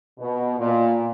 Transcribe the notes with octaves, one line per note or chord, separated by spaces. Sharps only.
B2
A#2